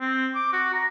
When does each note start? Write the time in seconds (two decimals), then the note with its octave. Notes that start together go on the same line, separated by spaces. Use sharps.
0.01 C4
0.35 D6
0.53 F#4
0.73 A#5